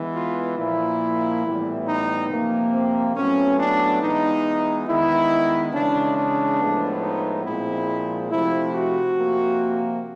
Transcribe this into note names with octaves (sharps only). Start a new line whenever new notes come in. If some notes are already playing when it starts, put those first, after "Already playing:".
Already playing: E3 G#3 B3
F4
A#2 F3 A#3 E4
A2 E3 G3 B3
D#4
C3 F3 A#3
C4
A2 F#3 B3 C#4
D4
E3 G#3 B3 D#4
D#3 G#3 B3 E4
C#3 E3 G#3 D4
D4
A2 F3 G#3 B3
D#4
A#2 F3 G#3 C4 E4
C3 F3 A3 E4
F#4
C3 F3 A#3